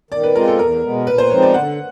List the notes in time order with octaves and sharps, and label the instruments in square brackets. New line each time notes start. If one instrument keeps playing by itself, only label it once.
[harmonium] D#3 [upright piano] D5
[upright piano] B4
[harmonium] G#3 C4 F4 [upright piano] A#4
[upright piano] A4
[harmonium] E2 [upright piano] A#4
[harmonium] B2 G#3 B3
[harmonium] A#2 [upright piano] B4
[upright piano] C5
[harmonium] F3 G#3 C4 D#4 [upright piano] C#5
[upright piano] D5
[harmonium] D3 [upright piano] F#5